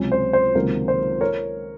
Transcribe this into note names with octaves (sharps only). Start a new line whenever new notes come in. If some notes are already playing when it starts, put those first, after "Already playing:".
Already playing: C#2 C3 F#3 C#4
C5
C5
C#2 C3 D#3 F#3 A#3 A#4
C5
A#4 C#5